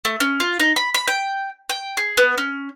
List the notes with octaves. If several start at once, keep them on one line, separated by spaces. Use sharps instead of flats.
A3
C#4
F4
D#4
B5
B5
G5
G5
G#4
B3
C#4